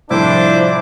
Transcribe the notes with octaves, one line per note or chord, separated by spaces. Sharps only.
C2 A2 F3 D4 E4 C5 D6